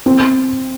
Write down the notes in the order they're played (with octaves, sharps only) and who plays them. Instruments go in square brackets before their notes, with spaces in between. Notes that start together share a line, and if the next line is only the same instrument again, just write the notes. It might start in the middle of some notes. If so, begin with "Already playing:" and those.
[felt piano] C4